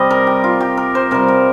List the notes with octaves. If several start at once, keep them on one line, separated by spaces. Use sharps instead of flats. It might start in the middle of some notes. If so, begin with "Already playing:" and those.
Already playing: C3 G3 D#5
A#4
G4
F4
G4
A#4
C5
C3 G3 A#4
A#4